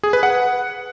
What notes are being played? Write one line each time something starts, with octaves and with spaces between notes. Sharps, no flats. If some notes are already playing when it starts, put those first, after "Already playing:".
G#4
B4
F#5